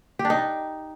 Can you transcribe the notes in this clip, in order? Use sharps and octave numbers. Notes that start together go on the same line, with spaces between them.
G4
D4
D#4